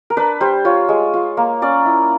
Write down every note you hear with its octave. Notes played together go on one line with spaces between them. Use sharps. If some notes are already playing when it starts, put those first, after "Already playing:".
A#4
D4 B4
G3 C5
F4 C#5
G#3
F4
A#3
C#4 D5
E4